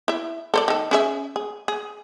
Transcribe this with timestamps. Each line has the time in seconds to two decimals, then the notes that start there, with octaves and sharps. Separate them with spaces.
0.08 E4 E5
0.54 A4 C5 D5
0.68 D#3 A4
0.91 C#4 G#4 E5
1.36 G#4
1.68 G#4